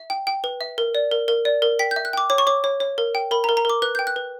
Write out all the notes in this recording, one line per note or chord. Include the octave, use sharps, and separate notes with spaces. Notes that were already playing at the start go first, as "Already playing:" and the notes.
Already playing: E5
G5
G5
B4
E5
A#4
D5
A#4
A#4
D5
A#4
G5 B6
G6
E5
F#6
G5 D6
C#5 D6
C#6
C#5 D6
C#5
C#5
A#4
G5
A#4 B5
A#5
A#4
A#5
A#4 D6
B4 F#6
G5 G6
F#6
B4